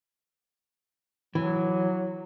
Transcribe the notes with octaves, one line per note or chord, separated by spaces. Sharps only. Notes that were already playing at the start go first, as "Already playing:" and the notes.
E3 F#3